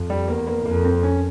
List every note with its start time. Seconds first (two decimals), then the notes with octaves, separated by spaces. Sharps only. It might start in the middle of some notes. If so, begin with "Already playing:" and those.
Already playing: F2
0.10 G3
0.28 E2 A#3
0.47 A#3
0.66 F2 A#3
0.85 C4
1.03 C#4